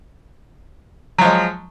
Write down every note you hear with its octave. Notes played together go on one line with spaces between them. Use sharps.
F3 F#3 G#3